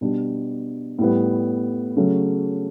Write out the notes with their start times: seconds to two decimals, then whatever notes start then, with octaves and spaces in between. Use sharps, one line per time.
0.01 B2 G3 D4
0.99 A2 G3 B3
1.96 C#3 F#3 A3 C#4